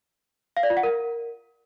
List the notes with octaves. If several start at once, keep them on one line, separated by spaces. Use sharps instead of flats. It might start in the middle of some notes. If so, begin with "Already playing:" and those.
F5
D5
F4
F#5
A#4